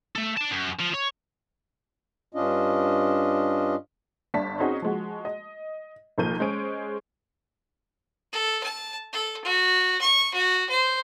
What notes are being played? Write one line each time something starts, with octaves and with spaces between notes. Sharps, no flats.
A3 A4
D5 A5
F#2
F3
C#5
G2 C#4 D4 F4 D#5
G1 G2 D4 E5 A5 B6
C4 C#4 D#4 F#4 G#4
F3 G#3 F#4
D#5
B1 D#3 F3 A#3 G6 D#7
G#3 C#4 G#4 C5 D7
A4
A5
A4
F#4
C#6
F#4
C5